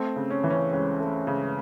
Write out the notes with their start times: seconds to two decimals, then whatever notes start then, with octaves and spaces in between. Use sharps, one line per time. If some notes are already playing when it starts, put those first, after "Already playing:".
Already playing: A3 C4
0.16 C#3
0.30 C#4
0.44 E3
0.50 C#4
0.72 C#2 C#4
1.00 A3
1.27 C#3